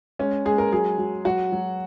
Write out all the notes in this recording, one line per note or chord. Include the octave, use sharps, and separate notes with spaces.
G#3 C#4
G#3 G#4
A#4
F#3 G#4
F#3
F#3 F#4
F#3